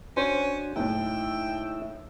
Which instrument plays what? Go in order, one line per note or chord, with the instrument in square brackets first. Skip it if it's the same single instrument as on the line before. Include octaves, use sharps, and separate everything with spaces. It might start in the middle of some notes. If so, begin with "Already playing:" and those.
[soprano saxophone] C#4 [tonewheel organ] D4 F#4 [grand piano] C5 C6
[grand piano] F#1 A2 [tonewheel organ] D#4 E4 E5 [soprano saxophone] G5